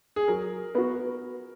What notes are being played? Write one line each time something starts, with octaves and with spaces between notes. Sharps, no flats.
G#4
F#3 A#4
B3 F#4